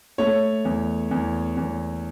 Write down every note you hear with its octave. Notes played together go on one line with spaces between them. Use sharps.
A3 C#5
E2
E2
E2